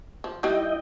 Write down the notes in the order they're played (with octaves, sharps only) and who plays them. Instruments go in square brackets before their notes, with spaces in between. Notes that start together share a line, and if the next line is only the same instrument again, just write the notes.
[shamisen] F3
[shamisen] D#3 E3 G3 [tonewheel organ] E4 D#5 G5